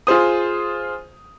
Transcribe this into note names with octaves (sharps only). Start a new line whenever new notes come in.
F4 G#4 C5 D#6